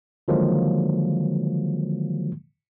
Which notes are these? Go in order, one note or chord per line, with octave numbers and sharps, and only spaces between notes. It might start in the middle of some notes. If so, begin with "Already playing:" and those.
D3 D#3 F3 F#3 G#3 A#3